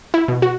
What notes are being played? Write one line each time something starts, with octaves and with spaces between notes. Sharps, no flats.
E4
B2
F#4